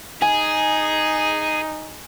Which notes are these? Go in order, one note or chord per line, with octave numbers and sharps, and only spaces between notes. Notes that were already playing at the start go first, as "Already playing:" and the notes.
D#4 G#4 G#5